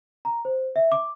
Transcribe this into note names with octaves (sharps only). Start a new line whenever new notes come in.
A#5
C5
E5
D6